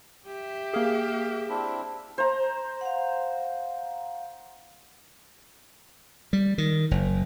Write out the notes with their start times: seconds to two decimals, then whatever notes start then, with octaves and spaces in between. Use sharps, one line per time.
0.27 G4 E5
0.73 A#3 G#4 F5
1.49 C4 D4 E4
2.18 C5 A#5
2.81 F5 F#5
6.33 G3
6.58 D#3
6.91 F#1